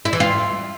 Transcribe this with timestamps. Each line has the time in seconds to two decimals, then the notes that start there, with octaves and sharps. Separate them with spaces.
0.05 E4
0.13 E3
0.20 F4